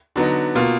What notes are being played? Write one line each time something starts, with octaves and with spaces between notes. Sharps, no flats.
D3 F#3 B3 D#4
B2 A#3 F4